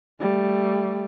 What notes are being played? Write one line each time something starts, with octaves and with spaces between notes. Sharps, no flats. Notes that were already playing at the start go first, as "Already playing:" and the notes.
G3 A3